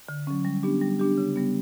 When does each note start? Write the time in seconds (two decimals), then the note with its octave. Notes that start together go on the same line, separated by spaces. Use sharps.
0.09 D3
0.27 F#3 C#4
0.45 G3
0.63 B3 D4 G4
0.81 G3
0.99 B3 D4 G4
1.18 C#3
1.36 G3 B3